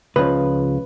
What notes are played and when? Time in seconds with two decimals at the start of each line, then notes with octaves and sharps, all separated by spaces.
0.16 C#2 C#3 F3 B4